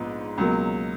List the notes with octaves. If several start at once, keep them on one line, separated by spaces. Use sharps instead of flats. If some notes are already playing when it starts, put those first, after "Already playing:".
Already playing: A#1 G#2 F3 B3
C#2 B2 F#3 A#3